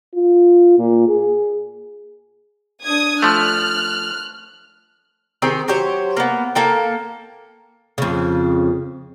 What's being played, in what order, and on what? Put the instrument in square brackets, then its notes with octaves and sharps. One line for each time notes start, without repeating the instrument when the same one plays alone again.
[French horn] F4
A#2
G#4
[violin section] D4 D#6 G#6
[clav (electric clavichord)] F3 A3 [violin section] F6 F#6
[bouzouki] D#3 C4 G4 G#4
F#3 G4 C5 C#5
A#3 B3
A#3 A4 G5
[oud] F2 C#3